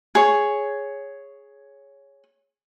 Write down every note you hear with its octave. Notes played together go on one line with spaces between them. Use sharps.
G#4 C#5